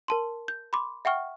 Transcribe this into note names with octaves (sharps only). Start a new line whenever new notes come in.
A#4 A5 C6
G6
B5 C6 D6
E5 F#5 G5 C#6 F6